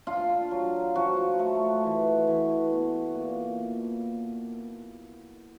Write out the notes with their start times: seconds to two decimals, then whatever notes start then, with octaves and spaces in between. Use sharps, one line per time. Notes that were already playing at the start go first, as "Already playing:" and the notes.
0.07 D4 F4
0.51 F#3
0.95 F3 F#4
1.39 A3
1.84 E3
2.27 E3
2.71 B3
3.15 A#2